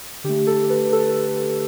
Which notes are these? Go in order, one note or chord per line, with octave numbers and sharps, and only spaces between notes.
D3 A3 G4
A4
B4
A4